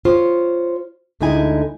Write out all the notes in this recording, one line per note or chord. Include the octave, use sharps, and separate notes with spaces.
F4 C5 C#5
D2 D3 G#3 D#4 E4 G#5